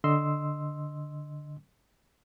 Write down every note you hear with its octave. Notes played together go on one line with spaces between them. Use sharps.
D3 D#5 C6 E6